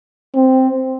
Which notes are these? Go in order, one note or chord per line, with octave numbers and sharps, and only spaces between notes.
C4